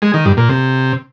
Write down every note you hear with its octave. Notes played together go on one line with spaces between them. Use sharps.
G#3
D#3
G2
A#2
C3